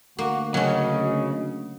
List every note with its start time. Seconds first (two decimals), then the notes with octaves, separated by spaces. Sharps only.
0.19 D2 A#3 F#4
0.54 C#3 F#3 C#4 D#5